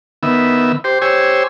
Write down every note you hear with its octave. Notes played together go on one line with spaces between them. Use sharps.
D#3 B3 E5
G4 C5
G4 C5 C#5 G#5 E6